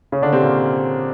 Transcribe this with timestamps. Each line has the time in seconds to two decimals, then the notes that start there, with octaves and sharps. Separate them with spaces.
0.12 C#3 C#4
0.22 D3 D4
0.32 C3 C4
0.42 A#2 A#3